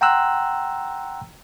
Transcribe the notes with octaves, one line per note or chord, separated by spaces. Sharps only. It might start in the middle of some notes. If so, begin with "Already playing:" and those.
F#5 G5 A#5 C6 E6 F#6